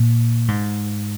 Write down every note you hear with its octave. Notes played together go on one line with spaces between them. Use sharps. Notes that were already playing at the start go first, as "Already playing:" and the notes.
Already playing: A#2
G#2